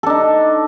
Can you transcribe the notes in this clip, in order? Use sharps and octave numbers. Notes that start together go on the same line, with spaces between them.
D4 D#4 A4